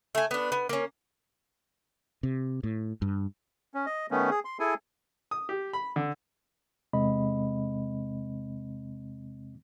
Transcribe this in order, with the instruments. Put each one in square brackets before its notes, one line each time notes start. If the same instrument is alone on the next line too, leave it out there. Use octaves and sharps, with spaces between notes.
[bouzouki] A3 G#5
B3 D4
B3
A#3 C#4
[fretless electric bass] C3
A2
G2
[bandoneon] C#4
D#5
D#3 A3 B3 C#4
G#4
C6
E4 G#4 A4 G#5
[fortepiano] D#6
G4
B5
D3
[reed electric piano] E2 C3 G#3 C4 D#5 B5